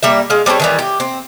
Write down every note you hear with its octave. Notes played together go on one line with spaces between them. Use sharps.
G3 A#3 E5
G#3 F5
G3 C4 A4 C#5
D#3 E3 G3
G4
C4